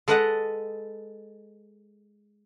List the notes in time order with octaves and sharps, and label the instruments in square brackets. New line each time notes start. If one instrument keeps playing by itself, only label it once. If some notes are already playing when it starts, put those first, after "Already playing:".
[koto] G#3 A4 B4 D#5 F#5